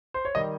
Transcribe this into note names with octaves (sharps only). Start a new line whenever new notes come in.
C5
C#5
D#3 G3 D#5